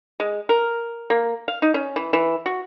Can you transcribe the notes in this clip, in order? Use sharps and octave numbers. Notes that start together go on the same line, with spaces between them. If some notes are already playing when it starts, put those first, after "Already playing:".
G#3
A#4
A#3
F5
D#4
C#4
E3
E3
F#4